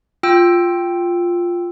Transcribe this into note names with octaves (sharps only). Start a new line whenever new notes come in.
F4 G5 E6